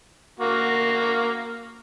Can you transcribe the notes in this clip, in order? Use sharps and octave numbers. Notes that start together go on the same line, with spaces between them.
A#3 F#4